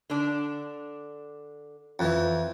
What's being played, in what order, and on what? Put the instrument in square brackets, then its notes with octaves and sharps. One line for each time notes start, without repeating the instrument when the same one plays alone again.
[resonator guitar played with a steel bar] D3 D4
[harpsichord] F2 E3